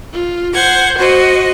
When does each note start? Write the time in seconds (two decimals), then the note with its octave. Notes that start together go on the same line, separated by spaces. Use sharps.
0.12 F4
0.53 C5 F#5 G#6
0.97 F#4 C5 D#5